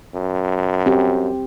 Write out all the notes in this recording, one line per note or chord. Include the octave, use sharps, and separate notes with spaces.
F#2
C4 G4